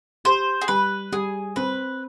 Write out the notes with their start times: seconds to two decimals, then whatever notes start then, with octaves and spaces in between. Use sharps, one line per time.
0.25 G4 C5
0.61 G#4
0.68 G3 B4
1.12 G3 G#4
1.56 C4 B4